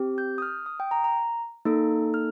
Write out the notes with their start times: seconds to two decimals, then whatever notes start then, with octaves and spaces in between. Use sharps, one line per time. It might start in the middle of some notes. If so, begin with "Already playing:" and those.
Already playing: C4 G4
0.18 G6
0.38 D#6
0.42 F6
0.66 D#6
0.80 G5
0.91 A#5
1.04 A#5
1.65 A#3 D#4 A4
2.14 F6